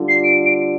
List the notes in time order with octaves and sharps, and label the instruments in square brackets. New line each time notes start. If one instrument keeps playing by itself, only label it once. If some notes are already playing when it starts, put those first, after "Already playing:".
Already playing: [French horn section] D3 G3 D4 F4
[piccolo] C7
D7
D7